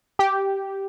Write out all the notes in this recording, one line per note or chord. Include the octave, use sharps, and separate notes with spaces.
G4